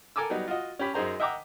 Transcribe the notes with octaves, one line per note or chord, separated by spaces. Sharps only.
A4 A#4 G#5 D6 E6
F#3 G3 B3 D#4
F4 F#4 D#5
C#4 G4 B5
F#2 D#4 G#4 C5 A#5
D#5 E5 F#5 G5 A#5 D6